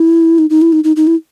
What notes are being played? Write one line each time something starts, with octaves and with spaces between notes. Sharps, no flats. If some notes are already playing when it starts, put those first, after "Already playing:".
Already playing: E4
D#4
D#4
E4
D#4
D#4
D#4
E4